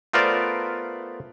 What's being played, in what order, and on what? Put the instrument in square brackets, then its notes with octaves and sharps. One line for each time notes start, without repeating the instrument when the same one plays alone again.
[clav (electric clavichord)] A3 B3 F4 A#4 C5 D5